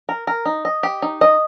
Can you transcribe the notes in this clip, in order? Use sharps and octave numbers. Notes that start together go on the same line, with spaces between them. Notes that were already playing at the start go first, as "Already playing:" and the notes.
A#4
A#4
D#4
D#5
G4
D#4
D#5